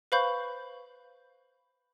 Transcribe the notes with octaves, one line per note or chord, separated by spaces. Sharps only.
B4 C5 F5 B5 C#6 G6